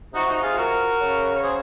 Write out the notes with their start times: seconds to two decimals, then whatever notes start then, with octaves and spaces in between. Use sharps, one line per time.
0.13 C3 F3 D#4 F#4
0.27 D#4 F#4
0.42 F4 G#4
0.56 F#4 A#4
1.00 C#3 F#3
1.36 C#5
1.43 G#4 C5